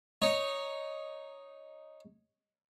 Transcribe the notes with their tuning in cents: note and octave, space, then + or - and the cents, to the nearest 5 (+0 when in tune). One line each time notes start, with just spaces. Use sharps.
D#4 +0 C#5 +0